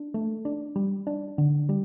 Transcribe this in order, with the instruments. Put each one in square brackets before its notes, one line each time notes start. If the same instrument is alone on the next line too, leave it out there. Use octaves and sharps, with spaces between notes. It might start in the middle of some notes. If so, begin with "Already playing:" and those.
Already playing: [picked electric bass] D4
A3
D4
G3
D4
D3
G3